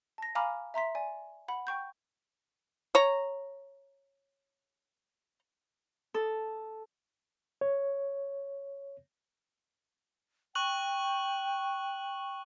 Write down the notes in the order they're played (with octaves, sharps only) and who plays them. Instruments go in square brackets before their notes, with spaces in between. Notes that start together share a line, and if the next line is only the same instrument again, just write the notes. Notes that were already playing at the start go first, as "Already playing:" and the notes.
[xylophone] A5 A#6
F5 G#5 A#5 B5 D6 F6
E5 A#5 C6 B6
D5 G#5
F#5 B5
G5 C#6 G6
[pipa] C#5 A#5
[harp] A4
[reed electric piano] C#5
[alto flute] G5 [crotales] C#6 F#6 F#7